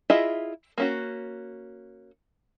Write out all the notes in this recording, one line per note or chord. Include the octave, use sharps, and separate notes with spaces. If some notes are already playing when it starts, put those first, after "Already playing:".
E4 F4 G#4 D#5 E5
A#3 C#4 F#4